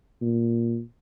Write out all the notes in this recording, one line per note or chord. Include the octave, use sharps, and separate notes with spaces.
A#2